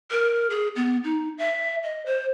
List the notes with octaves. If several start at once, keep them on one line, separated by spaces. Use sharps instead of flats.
A#4
G#4
B3
D#4
E5
D#5
C5